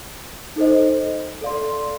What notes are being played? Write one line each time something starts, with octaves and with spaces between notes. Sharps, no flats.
D#4 A4 C5 D#5
A4 D5 F5 C6